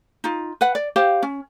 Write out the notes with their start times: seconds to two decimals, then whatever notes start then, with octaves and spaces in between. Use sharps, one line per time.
0.24 D#4 F4
0.61 B4 F#5
0.75 D5
0.96 G4 C5 F5
1.23 C#4